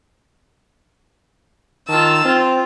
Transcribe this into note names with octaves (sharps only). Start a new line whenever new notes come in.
D#3 F4 A5 E6
C4 F4